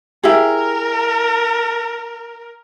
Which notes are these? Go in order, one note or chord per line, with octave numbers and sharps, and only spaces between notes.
E4 G4 G#4 A#4